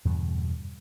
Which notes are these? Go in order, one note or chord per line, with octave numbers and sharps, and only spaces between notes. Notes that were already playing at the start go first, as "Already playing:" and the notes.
E2 G2 B2 D3